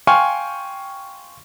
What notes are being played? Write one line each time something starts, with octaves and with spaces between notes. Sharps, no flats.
F5 G5 G#5 C6 C#6 F6